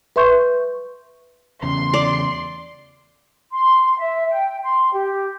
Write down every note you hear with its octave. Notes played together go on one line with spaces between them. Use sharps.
B4 E5 C6 C#6 G6
E2 C#3 C6
D5
C6
E5
G5
C6
G4